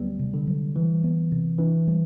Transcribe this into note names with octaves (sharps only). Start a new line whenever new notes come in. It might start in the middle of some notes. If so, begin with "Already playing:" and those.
Already playing: D2 F#3 G3 B3
C3
D3
F#3
E3 G3
B3
C3
E3 D4
G3